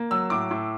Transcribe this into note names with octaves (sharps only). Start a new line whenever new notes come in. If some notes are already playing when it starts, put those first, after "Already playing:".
Already playing: A#3
F#3 E6
A2 D6
A2